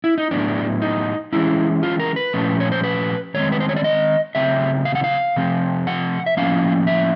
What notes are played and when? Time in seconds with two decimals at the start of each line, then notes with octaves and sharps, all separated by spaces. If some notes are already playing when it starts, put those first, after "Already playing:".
0.04 E4
0.18 D#4
0.31 A2 F#3 B3 D4
0.82 D#4
1.32 E3 G#3 C#4 E4
1.83 F4
1.99 A#4
2.16 B4
2.33 A#2 F3 A3 C#4
2.60 C#5
2.72 C5
2.84 B4
3.34 D#3 G#3 C4 C#5
3.52 B4
3.60 C5
3.69 C#5
3.76 D5
3.84 D#5
4.35 C#3 F#3 A3 C4 E5
4.85 F5
4.95 F#5
5.04 F5
5.36 C3 F3 A3 C4
5.87 F#5
6.26 E5
6.37 A2 F3 A#3 C#4 F5
6.87 E5